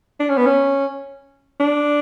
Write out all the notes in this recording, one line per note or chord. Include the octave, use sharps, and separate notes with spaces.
D4
C#4
B3
C#4
D4